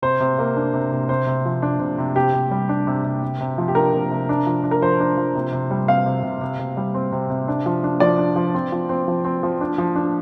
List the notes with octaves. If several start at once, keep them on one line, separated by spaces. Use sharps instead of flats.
C3 C5
C3
A#3
D4
C3
C3
C3 C5
C3
F3
D4
C3
C3
C3 G4
C3
G3
D4
C3
C3
C3
C3
F3
G4
D4 A#4
C3
C3
D4
F3
D4
A#4
F3 C5
D4
F3
C3
C3
G3
C4 F5
C3
C3
C3
C3
G3
C4
C3
C3
D4
F3
D4
F3 D5
D4
F3
C4
F3
C4
F3
C4
F3
D4
F3
D4